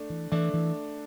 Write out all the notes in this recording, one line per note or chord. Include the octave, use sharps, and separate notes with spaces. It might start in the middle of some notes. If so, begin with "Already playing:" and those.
Already playing: A3 D4
E3
E3 A3 D4
E3